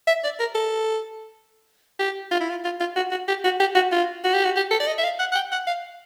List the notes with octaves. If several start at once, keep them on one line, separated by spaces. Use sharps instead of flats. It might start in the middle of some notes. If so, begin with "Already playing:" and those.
E5
D5
A#4
A4
G4
F4
E4
F4
F4
F4
F#4
F#4
G4
F#4
G4
F#4
F4
F#4
G4
F#4
G4
A4
D5
D#5
E5
F5
F#5
F#5
G5
F#5
F5